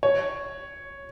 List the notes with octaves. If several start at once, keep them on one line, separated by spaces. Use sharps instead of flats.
C#5